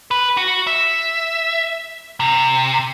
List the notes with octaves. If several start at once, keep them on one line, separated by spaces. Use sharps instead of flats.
B4
F#4
E5
C3